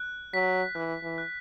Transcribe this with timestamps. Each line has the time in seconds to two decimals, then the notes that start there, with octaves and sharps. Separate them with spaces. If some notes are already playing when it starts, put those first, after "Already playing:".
Already playing: F#6
0.33 F#3 B6
0.75 E3 F#6
1.03 E3
1.18 F#6